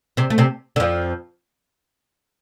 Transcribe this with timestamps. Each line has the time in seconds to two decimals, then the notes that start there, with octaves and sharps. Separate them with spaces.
0.17 C3 C4
0.30 A3
0.38 C3 C4
0.76 D3
0.80 F2 F3